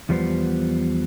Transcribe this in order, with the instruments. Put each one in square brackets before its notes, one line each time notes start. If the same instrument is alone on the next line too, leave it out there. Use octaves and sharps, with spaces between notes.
[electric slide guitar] E2 F3 G3 B3 C5